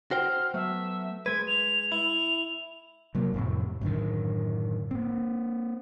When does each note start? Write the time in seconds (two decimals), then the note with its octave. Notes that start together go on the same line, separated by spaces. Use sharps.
0.11 F#4 C5 G5 F6
0.54 F#3 A3 B3 E5
1.26 G#3 B4 G#6
1.48 F7
1.92 E4 F7
3.15 C3 F#3 A#3
3.34 F2 A2 C3
3.81 F#2 A2 D3 D#3
4.91 A#3 C4